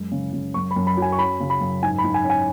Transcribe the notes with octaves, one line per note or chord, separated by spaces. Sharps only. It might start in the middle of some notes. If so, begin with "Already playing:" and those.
Already playing: F#2 G#3
C#3
C#3
F#2 C#6
B5
F#2
B5
F#3
G#5
C#6
C#4 B5
C#3
B5
F#2
G#2 G#5
B5
G#2
G#5
C#4
G#5